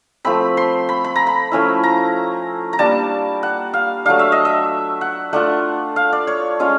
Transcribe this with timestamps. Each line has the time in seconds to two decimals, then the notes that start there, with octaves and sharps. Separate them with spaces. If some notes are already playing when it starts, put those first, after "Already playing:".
0.25 F3 A3 C4 B5
0.57 C6
0.89 B5
1.04 B5
1.16 A#5
1.27 B5
1.52 F3 A3 C#4 E4
1.83 A#5
2.73 A#5
2.79 G3 A#3 D4 A5
3.43 F#5
3.74 F5
4.05 F#3 A3 D4 F5
4.19 E5
4.32 D#5
4.45 E5
5.01 F#5
5.33 A3 D4 F4 F#5
5.96 F5
6.12 D5
6.27 C#5
6.59 G#3 C#4 F4